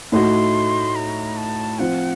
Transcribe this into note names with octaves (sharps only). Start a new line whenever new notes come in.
A2 A3 D#4 F#4 C6
A#5
A5
F3 C4 F4 F#5